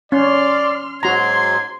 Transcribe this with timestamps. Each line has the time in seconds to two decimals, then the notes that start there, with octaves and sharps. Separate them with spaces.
0.12 C#4 D5 C6 F6
1.03 G#2 F#3 F#4 A#5 C6 G#6